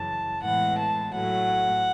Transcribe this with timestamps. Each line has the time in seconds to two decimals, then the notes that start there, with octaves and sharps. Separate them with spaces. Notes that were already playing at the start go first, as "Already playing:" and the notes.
Already playing: F#2 C#3 E3 A5
0.43 A2 E3 G#3 B3 F#5
0.78 A5
1.14 A2 F#3 A3 F#5